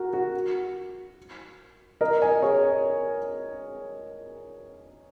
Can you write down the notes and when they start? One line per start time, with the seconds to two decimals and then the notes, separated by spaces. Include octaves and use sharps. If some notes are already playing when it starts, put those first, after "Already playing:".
Already playing: F#4 A#4
0.13 F#4
2.01 A#4 D#5
2.21 D#5 G#5
2.42 G#4 C#5